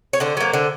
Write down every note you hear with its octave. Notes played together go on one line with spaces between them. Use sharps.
C#5
D3 C5
F#3 A#3
D3